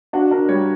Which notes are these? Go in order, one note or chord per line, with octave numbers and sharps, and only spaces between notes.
D4 F#4
D4 A#4
G3 C#5